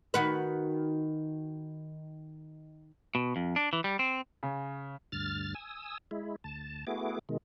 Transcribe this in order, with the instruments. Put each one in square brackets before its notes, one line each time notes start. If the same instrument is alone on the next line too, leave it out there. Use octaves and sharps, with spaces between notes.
[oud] D#3 F#4 B4
[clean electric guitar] B2
F2
D4
E3
G3
C4
[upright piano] C#3
[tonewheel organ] D2 G2 F6 A6
G#5 D#6 E6
G#3 E4
D2 A5
A3 B3 E4 F#4 G#4 D6
B2 D#3 G#3